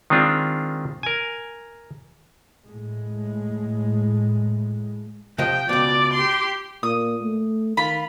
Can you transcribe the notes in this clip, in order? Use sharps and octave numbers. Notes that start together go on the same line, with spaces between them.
D#3 G#3 C4 D4 F4
A#4 G#5
A2 G#3
C3 F3 D#5 G5
C#2 B2 D5 D6
G4 C6
A#2 D#6
A3
D#3 F4 B5